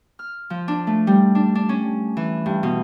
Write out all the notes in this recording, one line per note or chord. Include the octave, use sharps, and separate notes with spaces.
F6
F3
D4
A3
G3
D4
D4
C#4
E3
G2
B2